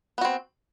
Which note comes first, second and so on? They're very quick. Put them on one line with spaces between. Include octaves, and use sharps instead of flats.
B3 F#4 C4